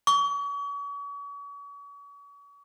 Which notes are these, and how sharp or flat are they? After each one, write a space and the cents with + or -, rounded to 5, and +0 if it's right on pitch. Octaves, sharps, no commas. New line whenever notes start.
C#6 +40